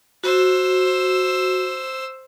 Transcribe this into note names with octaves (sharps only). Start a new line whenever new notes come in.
F#4 C5 E6